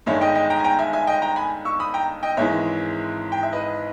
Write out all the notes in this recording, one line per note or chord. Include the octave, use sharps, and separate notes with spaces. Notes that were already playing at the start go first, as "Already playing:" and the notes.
G1 G2 D#3 G#3 C#5 E5
D#5 G5
D#5 G5
G5 A#5
G#5
G5 A#5
E5 G#5
E5 G#5
D#5 G5
G5 A#5
G#5 B5
C#6 E6
B5 D#6
G5 A#5
D#5 G5
G#1 G#2 E3 G#3 C#5 E5
G5
E5
B4 D#5